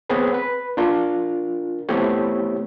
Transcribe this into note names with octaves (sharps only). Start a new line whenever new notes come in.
B3 C4 G#4 B4 C#5
B4
D4 F4 A#4
A3 B3 C4 E4 G4 C#5